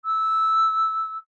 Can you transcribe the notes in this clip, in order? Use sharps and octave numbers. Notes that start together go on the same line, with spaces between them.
E6